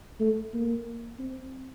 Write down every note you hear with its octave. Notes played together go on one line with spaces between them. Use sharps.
A3
A#3
C4